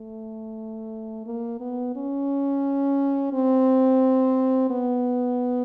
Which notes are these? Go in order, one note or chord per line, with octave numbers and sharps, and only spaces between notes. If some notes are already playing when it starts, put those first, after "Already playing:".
Already playing: A3
A#3
B3
C#4
C4
B3